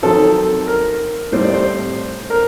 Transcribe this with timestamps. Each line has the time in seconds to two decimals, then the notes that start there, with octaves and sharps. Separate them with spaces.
0.03 D#3 F#3 C4 A4
0.67 A#4
1.32 A2 G3 C4 C5
1.43 D5
1.54 C5
2.30 A#4